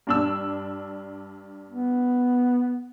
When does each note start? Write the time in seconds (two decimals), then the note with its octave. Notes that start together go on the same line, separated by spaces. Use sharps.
0.07 G2 D4 E6
1.70 B3